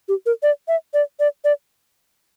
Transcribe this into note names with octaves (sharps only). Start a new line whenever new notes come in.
G4
A#4
D5
E5
D5
D5
D5